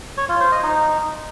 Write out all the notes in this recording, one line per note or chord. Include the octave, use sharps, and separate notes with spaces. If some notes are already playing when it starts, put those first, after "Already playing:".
C#5
F4
C5
D#5
D#4